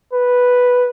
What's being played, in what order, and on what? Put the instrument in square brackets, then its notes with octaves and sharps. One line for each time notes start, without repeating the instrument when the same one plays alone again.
[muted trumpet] B4